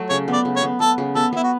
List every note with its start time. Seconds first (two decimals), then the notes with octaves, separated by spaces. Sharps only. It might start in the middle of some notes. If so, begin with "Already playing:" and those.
Already playing: F#3 A3
0.09 C#3 C#5
0.28 B3
0.33 D5
0.45 C#3
0.56 C#5
0.63 B3
0.80 B3 A4
0.98 C#3
1.15 B3 A4
1.33 B3 E4
1.44 F#4